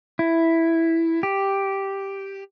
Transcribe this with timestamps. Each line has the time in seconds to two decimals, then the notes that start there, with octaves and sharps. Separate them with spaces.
0.19 E4
1.23 G4